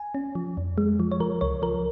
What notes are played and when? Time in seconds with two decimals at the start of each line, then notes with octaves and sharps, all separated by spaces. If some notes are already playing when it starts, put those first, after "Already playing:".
Already playing: G#5
0.15 C#4
0.35 F3
0.57 F2
0.78 G#3
1.00 F3
1.12 C#5
1.20 F3 A#4
1.41 C#2 C#5
1.62 F3 A#4